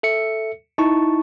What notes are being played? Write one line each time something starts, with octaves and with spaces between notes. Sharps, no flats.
A4 E5 C#7
D#4 E4 A5 C#6